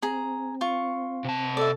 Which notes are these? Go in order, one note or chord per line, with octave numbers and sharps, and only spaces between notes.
C4 G#4 A#5
F4 C#6
C3 A5
A4 D5 E5